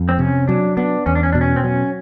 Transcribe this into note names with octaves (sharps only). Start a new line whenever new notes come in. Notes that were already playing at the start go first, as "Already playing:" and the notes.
Already playing: F2
C4
C3 C#4
F#3 D4
B3 D4
E2 C#4
D4
C#4
B2 D4
C#4
C4
F#3 C#4